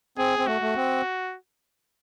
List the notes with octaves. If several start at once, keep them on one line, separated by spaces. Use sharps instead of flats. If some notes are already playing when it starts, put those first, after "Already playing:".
C4 G#4
C4
A3 F#4
A3
C4